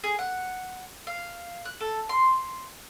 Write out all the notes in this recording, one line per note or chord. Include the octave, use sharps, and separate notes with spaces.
G#4
F#5
F5
F#6
A4
C6